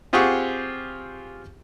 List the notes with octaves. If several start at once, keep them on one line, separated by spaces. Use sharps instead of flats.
C4 F4 G4 G#4 F#5 C#6